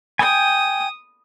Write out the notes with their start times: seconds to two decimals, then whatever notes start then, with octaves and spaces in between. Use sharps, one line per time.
0.19 G5 G#5 D#6